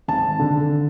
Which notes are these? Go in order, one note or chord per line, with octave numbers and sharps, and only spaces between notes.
G#1 A5
D3